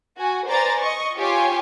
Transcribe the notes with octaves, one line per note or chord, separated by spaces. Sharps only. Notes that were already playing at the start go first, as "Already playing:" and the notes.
F#4 G#5
B4 C5 D5 G#5 A#5 A6
D#5 C#6
F4 G4 C#5 G#5